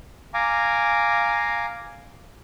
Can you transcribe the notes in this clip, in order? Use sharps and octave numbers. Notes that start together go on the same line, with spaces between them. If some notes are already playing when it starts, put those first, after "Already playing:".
F5 G#5 A#5 D6